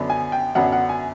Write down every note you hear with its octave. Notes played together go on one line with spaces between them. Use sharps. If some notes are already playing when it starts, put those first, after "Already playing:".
Already playing: F#2 D3 F#3 B3 D4
G#5
G5
F#2 D3 F#3 B3 D4 F#5
F#5
G#5